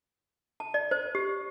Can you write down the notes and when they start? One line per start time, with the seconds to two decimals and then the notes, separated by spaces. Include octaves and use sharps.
0.60 A5
0.74 D5
0.91 C5
1.15 G4